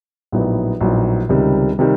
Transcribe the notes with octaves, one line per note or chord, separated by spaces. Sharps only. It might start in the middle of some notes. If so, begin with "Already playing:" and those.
A#1 A2 F#3 B3 D#4
A#1 A2 F#3 B3 D#4
C#2 C3 D#3 G3
C3 D#3 G3